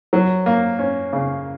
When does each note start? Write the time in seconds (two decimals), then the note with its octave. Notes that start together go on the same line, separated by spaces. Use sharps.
0.13 F#3
0.46 A#3
0.79 C#4
1.13 C#3